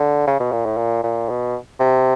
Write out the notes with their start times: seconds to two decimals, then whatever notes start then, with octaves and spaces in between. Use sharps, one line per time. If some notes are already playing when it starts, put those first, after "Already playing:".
Already playing: D3
0.27 C#3
0.40 B2
0.52 A#2
0.65 A2
0.77 A#2
1.03 A#2
1.29 B2
1.80 C3